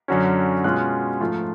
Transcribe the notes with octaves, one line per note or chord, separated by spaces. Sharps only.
F#2 D3 F#3 C#4
B2 G#3 C#4 F4 F#6
G#2 F3 A3 F4